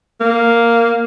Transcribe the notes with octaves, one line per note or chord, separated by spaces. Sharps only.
A#3